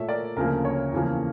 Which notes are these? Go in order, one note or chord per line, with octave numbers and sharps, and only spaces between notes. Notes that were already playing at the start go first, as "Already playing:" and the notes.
Already playing: A#2 A3 C#5 E5
A#4 D5
D2 C#3 F3 A#3 A#4
C#5
E2 C#3 F3 A#3